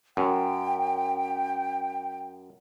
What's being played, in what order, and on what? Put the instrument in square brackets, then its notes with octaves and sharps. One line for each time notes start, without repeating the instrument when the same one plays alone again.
[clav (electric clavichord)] F#2 [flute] G5